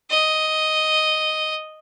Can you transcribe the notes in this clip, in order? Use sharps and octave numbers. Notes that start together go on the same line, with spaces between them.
D#5